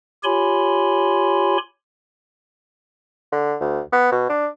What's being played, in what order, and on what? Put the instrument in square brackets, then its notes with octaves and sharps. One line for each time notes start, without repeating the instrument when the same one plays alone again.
[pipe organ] F4 G4 C#5 G#5 B5 C6
[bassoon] D3
D2
B3
B2
D4